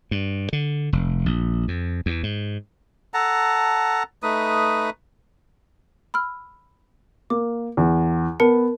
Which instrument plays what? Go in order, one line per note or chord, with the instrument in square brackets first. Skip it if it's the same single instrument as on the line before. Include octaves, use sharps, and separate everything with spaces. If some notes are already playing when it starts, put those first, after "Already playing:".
[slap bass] G2
D3
F1
A#1
F2
E2
G#2
[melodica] A4 F#5 A5 A#5
A3 D#4 B4 D#6
[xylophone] B5 E6 F6
[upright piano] A#3 [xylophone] D6
[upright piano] E2
[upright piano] B3 [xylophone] A#4 A5 C#7